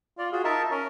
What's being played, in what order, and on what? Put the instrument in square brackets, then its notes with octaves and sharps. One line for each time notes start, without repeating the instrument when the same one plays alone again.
[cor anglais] F4 [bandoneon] D5
[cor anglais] F4 [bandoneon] F#4 G#4
[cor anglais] D#4 [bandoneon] A#4 E5 A5
[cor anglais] C#4 [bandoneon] A#4